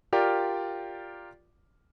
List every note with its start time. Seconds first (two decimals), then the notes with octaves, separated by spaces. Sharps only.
0.13 F4 G4 A#4 D5 F6